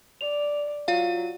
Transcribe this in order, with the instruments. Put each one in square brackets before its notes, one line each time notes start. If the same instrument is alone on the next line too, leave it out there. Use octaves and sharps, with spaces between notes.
[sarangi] D5 [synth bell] F7
[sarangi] F#3 [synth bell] F4 F5